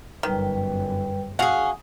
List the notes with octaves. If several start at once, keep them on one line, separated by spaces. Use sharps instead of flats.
G1 F#2 D#3 G3 B4 G5
C#4 F#4 G#4 F5 F#5 D#6